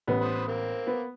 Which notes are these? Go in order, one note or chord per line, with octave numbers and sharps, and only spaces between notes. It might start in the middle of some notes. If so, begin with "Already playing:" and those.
A1 B3
B4 C5 D#6
A#3 C4
B3